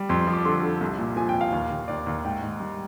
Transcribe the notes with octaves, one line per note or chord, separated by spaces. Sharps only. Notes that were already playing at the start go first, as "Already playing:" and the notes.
Already playing: G3
F2 C6
C6
F3
D6
D3 C6
D3
C2
A#2
F3 G#5
G5
C2
F5
D#2
D#2
D#2 D5
D#2
G#2 G5
G#2
G3